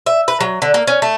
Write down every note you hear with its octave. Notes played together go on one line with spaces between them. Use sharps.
E5
B4
F#3
D3
A#3
C#4
A3